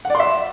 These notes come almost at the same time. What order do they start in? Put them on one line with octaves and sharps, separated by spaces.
F#5 D5 C6 E5